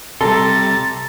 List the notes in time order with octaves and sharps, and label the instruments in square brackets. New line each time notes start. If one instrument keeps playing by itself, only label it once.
[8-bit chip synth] C3 G3 [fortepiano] A4 [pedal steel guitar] A#5 C6 [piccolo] A6